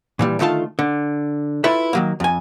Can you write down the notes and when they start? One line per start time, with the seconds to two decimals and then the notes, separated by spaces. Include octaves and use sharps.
0.19 A#2 E3 G3
0.39 D3 D#3 A3 F4 A5
0.79 D3
1.64 E4 F4 A4 B4 E5
1.93 D#3 F#3 A#3
2.20 F2 G#5